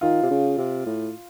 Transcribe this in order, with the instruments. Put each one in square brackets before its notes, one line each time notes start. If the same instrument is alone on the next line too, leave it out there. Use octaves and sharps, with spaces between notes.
[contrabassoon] D#3 [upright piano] F4
[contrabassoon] C3
C#3
C3
A2